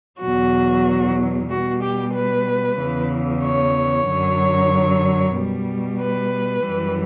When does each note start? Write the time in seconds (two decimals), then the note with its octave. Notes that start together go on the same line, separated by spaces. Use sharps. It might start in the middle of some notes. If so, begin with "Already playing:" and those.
0.20 E2 B2 F#3 F#4
1.49 B2 G3 F#4
1.82 G4
2.14 B4
2.78 E2 C#3 E3
3.43 C#5
4.07 F#2 D3 F#3
5.36 B2 G3
6.01 B4
6.66 F#2 E3 G3